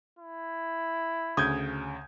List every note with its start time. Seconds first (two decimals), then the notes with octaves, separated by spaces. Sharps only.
0.19 E4
1.37 D2 C#3 D#6 G6 G#6